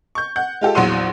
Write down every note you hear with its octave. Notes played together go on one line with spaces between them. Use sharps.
C#6 G6
F#5 G6
G#3 F4 G4 A4
A#1 E2 F#3 F#5 C6 D#7